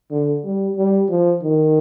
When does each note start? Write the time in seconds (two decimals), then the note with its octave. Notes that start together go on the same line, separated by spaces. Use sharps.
0.11 D3
0.44 G3
0.76 G3
1.09 F3
1.43 D#3